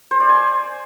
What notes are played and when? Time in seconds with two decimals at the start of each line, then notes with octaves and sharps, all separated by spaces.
0.11 C5
0.20 D5
0.29 G#5